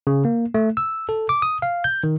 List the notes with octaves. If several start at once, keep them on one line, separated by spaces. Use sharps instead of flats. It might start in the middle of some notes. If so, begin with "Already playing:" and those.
C#3
A#3
A3
E6
A4
D6
D#6
F5
G6
D#3